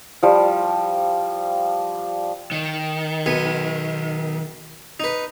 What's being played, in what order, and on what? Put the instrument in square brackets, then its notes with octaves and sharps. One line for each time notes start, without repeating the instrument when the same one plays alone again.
[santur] F3 G3
[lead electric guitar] D#3
[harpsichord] B1 B3 G#5
D#4 B4